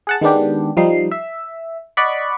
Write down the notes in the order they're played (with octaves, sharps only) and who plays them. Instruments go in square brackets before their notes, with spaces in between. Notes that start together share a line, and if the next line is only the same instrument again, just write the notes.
[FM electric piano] G#4 F#5 A5
D#3 G#3 B3 D4 G4
F3 G3 D#4 C7
E5
D5 D#5 F#5 B5 C#6